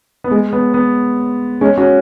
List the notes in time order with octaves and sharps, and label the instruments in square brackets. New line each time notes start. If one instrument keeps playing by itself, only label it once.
[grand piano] B3
G#3
B3
B3
G#3 C#4
C#4 F#4